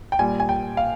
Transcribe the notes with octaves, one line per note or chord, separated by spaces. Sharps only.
G5
A#2 G3 G#5
G#5
G5
F5